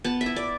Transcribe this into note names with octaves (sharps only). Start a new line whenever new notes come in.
B3 A5
E5
E4
D5